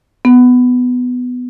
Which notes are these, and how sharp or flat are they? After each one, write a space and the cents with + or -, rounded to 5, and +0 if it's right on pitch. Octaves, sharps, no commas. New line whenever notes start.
B3 +10